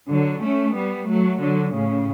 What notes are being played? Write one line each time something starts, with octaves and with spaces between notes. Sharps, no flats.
D3 F#3
A3 C#4
G3 B3
F#3 A3
D3 F#3
A2 C#3